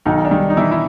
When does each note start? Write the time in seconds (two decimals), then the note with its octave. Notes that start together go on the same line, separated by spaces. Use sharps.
0.05 B1 D#3 D#4
0.25 D4
0.31 D#3 G3 D#4
0.50 D#4
0.57 B2 E3 E4
0.71 E4